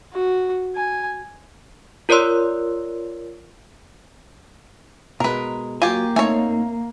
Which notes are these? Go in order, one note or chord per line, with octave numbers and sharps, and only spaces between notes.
F#4
G#5
F4 A#4 C#5 D5 C6 E6
B2 G#3 A#4 B4
F#3 A#3 F4 G4 G5 G#5
A3 C4 D#4 C#5 G#5